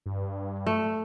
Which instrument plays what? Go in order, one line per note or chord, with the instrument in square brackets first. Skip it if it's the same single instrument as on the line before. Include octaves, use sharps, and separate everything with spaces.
[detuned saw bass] G2
[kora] A3